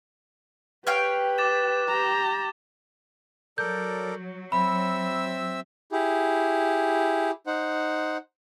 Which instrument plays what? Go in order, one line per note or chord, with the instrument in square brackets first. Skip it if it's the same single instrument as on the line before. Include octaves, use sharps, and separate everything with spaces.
[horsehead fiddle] G4 [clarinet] B4 [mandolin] C#5 F5 G5
[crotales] D6 A6 E7
[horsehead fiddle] G4 A#5
[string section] F#3 [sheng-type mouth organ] A4 A#4 D5 [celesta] G6
[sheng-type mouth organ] C4 E5 E6 [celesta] B5
[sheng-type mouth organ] E4 G4 G#4
D#4 C5 F#5